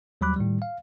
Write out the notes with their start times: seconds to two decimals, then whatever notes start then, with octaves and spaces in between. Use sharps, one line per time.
0.21 D#2 F#3 G3 B5 D6 F#6
0.36 A2 D#3 G3
0.62 F5